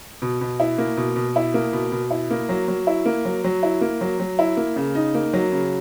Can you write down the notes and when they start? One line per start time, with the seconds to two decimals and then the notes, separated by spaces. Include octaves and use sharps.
0.22 B2
0.41 B2
0.60 E4
0.78 A#3
0.97 B2
1.16 B2
1.36 E4
1.54 A#3
1.73 B2
1.92 B2
2.11 E4
2.31 A#3
2.49 F#3
2.68 F#3
2.87 E4
3.05 A#3
3.25 F#3
3.44 F#3
3.63 E4
3.81 A#3
4.01 F#3
4.20 F#3
4.39 E4
4.57 A#3
4.76 C#3
4.95 D#4
5.15 A#3
5.34 F#3
5.52 C#3